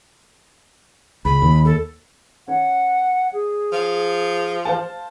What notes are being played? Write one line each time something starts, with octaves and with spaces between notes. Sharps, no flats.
C#2 B5
D#2
A4
C#4 F#5
G#4
F3
C5 F5 A5